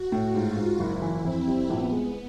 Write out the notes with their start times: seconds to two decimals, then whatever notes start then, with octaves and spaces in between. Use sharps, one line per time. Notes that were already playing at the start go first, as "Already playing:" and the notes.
Already playing: F#4
0.12 A2
0.34 G#2 F4
0.57 G#2
0.79 F#1 E4
1.02 E3
1.25 F2 C4
1.47 G3
1.70 A#1 B3
1.92 G#3